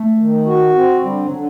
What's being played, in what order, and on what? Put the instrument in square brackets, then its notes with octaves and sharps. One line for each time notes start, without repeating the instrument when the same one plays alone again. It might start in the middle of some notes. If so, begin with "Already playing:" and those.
Already playing: [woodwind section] A3
[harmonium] D#3
F#4
C4
[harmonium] D3 [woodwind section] G3
[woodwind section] F#3
[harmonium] D3